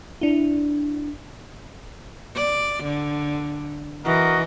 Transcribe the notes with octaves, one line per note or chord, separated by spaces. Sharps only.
D4 E4
D5
D3
E3 F#4 A#4 D#5